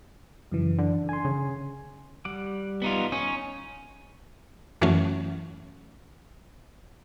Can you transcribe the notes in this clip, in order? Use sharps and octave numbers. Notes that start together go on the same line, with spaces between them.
F#2 C#3 E3
D3
G#5 C6
C#3
G3 F#5 D6
B3 D#4 F4
C#4 D#4 C#5
F#2 E3 F#3 A3 C#4